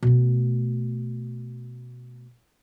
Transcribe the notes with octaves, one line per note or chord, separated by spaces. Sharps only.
B2 A3